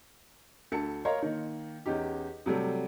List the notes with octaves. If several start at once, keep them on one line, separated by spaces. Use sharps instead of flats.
D2 A4 A5 C#7
A#4 C#5 D#5 F5 A#5 C6
D#3 A#3
E2 C#4 D#4 G4
C3 F#3 G3 A3